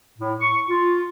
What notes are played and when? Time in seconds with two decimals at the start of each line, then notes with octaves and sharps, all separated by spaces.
0.18 A2
0.40 C#6
0.69 F4